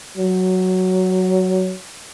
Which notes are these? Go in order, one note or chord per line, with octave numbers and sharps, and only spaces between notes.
F#3